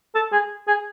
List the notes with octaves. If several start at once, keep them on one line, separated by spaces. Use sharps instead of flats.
A4
G#4
G#4